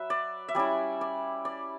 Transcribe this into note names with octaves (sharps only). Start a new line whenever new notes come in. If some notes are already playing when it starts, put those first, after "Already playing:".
Already playing: F#3 B4 E5
D5
E5
G3 C#4 E4 D5
D5
D5